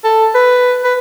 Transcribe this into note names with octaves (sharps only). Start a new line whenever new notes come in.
A4
B4
B4